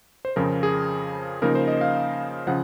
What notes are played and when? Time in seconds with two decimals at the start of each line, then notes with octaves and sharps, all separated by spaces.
0.25 C5
0.36 F2 C#3 F3 A#4
0.63 G#4
1.42 C#3 F3 A#3 D#4 A#4
1.55 C5
1.68 D#5
1.81 F5
2.47 C#3 F3 F#5